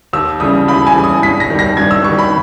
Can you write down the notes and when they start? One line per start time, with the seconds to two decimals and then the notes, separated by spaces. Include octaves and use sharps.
0.13 D#2 E6
0.40 C#3 E3 G3 D#6
0.68 D#2 B5
0.87 G#5
0.95 C#3 E3 G3
1.04 D#6
1.22 G2 B6
1.40 A#6
1.50 D#3 G3
1.59 A#6
1.77 G2 G#6
1.91 E6
2.04 D#3 G3 C#6
2.19 B5